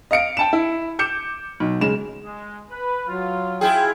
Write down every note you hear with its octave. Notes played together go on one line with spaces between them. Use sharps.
D#5 F5 C#7 D7
G5 A5 E7
E4
D6 G6 C#7 E7
B1
C#3 G#3 E7
G#3
B4
F#3 F4
E4 F4 G#4 G5